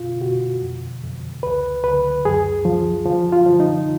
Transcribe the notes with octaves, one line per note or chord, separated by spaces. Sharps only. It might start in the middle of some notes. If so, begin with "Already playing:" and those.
Already playing: B2 F4
B2 F#4
F2
F2
C#2 B4
C#2 B4
F#2 G#4
F3
F3
F4
F3
D#4